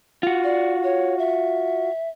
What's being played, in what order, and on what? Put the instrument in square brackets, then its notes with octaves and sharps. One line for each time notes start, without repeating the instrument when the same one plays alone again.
[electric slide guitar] F4 F#4
[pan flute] D5
C#5
E5